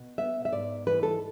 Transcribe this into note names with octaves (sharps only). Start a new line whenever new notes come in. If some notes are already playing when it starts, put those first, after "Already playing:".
Already playing: B2
B3 E5
E5
G#2 D5
E3 B4
A4